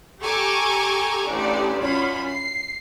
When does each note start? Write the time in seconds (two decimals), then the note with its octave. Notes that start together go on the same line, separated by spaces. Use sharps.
0.20 G4 A4 G#5 A#5 C#6 D6
1.26 A1 D4 G4 D5
1.78 F#2 F4 B5
2.30 C7